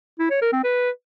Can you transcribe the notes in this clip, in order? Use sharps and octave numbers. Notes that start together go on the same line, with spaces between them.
E4
C#5
A#4
C4
B4